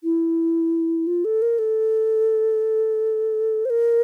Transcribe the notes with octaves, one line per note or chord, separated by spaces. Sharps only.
E4
F4
A4
A#4
A4
C5
A#4